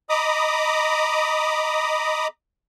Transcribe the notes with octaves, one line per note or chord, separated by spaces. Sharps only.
D#5 A#5 B5 D6 D#6